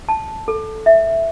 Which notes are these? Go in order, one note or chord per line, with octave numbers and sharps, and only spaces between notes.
A5
A4
E5